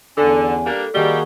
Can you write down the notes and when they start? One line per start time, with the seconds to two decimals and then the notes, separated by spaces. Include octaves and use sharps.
0.18 E2 D3 C#4 A4
0.66 G3 A#3 D4
0.95 D#3 G3 A#3 F#4 G#4 D#5 G7